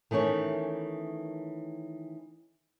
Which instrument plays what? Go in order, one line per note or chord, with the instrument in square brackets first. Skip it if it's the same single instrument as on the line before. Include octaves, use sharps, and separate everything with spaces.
[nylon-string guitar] D#3 E3 A3 C#4 C#5